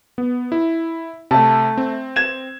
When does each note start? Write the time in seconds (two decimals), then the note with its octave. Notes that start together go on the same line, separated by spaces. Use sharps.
0.18 B3
0.52 E4
1.31 C3 A3 A5
1.77 C4
2.16 G#6 E7